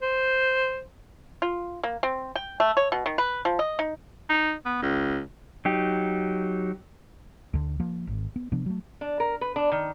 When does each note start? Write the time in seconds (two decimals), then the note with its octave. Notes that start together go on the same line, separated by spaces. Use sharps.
0.02 C5
1.42 F4
1.83 A#3
2.03 C4
2.35 G5
2.60 A3
2.77 C#5
2.92 B2
3.06 D#3
3.18 B4
3.45 F3
3.59 D#5
3.79 D#4
4.29 D#4
4.65 B3
4.82 C#2
5.65 F#3 D#4 G4
7.54 D2 D3
7.80 F3 A#3
8.07 G#1
8.36 B3
8.52 C3 F3 B3 D4
8.66 F#3 A3
9.01 D4
9.20 A#4
9.41 B4
9.56 D4
9.72 D#3